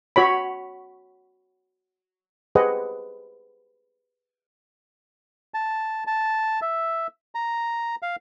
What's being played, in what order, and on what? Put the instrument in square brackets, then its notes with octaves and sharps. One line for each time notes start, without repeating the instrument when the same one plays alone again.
[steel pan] F#4 C#5 B5
G4 G#4 B4 C5 D#5 F#5
[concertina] A5
A5
E5
A#5
F5